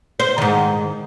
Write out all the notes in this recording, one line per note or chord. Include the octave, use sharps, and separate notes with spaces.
C5
G#2 D#3